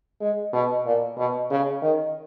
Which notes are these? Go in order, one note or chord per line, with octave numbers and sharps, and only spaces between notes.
G#3
B2
A#2
B2
C#3
D#3